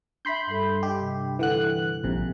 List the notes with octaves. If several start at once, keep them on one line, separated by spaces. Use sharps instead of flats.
D4 E5 B5 C6 G6
G2 G3 A4
D4 G4 D#5
C3
D3 E3 A4 F#5 F#6
A#1 C3